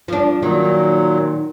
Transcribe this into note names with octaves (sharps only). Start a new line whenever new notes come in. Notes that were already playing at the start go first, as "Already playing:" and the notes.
F3 D4
A#2 D#3 F#3